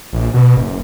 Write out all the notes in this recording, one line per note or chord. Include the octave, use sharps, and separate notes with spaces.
A#1
B2
F#1